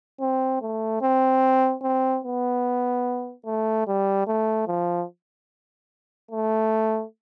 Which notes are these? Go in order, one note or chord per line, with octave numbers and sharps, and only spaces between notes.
C4
A3
C4
C4
B3
A3
G3
A3
F3
A3